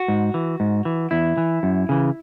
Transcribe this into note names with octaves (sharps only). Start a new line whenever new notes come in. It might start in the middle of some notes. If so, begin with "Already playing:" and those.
Already playing: F#4
G#2
E3
G#2
E3
E2 E4
E3
F#2
C#3 E3